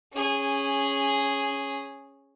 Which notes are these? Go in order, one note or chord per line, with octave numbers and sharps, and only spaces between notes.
C#4 G#4